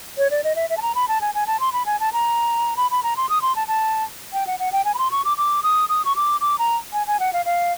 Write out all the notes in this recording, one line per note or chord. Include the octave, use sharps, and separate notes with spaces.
C#5
D5
D#5
E5
E5
A5
A#5
B5
A5
G#5
G#5
A5
C6
B5
G#5
A5
A#5
B5
B5
A#5
C6
D#6
C6
A5
A5
G5
F#5
F#5
G5
G#5
B5
C6
C#6
D6
D6
D#6
D#6
C#6
D6
D6
A#5
G#5
G#5
F#5
F5
F5